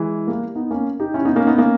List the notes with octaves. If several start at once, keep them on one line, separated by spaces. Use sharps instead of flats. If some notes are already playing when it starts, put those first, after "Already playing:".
Already playing: E3 G#3
G3 A#3
B3 D#4
A#3 C#4
D#4 G4
C#4 E4
B3 D#4
A#3 C#4
B3 D#4
A#3 C#4